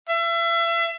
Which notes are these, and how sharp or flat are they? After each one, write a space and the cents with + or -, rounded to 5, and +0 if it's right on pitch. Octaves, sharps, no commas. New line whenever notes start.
E5 +35